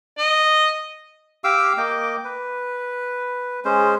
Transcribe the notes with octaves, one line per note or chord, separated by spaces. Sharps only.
D#5
G4 F5 D6 E6
A#3 D#5 G5 D6
B4
G#3 C#4 C5